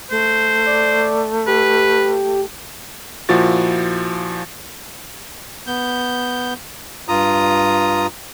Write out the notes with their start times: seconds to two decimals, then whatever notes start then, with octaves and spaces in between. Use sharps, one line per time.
0.11 A3 C5
0.66 D5
1.47 G4 B4
3.29 A#2 F3 E4 F#4 A6
5.67 B3 G6
7.08 G2 F4 A#5 D#6